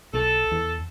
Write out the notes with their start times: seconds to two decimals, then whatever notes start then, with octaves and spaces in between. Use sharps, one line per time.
0.14 B1 A4
0.52 E2